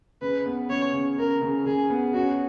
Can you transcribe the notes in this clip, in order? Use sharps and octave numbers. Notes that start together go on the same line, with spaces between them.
C#3 B4
B3
C#3 C#5
C#3
C#3 A#4
C#3
C#3 G#4
B3
C#4 F#4